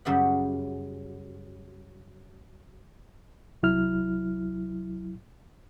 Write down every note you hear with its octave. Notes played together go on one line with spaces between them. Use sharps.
F#2 C#3 G3 E5 F#5
C2 F#3 E4 F6